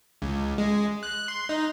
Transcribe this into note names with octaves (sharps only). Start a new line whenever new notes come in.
C#2
G#3
F#6
C6
D#4